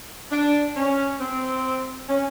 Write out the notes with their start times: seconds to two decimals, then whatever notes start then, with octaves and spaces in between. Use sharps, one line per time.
0.31 D4
0.76 C#4
1.20 C4
2.09 C#4